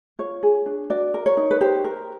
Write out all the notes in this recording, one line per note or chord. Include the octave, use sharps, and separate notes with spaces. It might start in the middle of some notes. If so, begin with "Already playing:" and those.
F4 C#5
G#4
D4
F#4 D5
A#4
C#5
D#4
B4
G4 C5
A#4